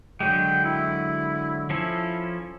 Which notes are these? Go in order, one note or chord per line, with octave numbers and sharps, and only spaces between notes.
D3 F#3 G#3 G5
E4
F3 C#4 E4 A4